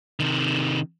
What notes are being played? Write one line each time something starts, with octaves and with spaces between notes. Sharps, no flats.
C3 D#3